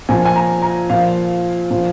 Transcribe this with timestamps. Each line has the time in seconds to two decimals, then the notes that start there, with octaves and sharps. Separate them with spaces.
0.09 A#2 F3 G#5
0.25 G#5
0.36 A#5
0.62 A#5
0.90 A#2 F3 F5
1.70 A#2 F3